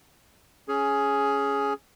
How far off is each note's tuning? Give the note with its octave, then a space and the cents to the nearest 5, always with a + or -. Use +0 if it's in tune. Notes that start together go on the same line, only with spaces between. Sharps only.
C#4 +5 G#4 +10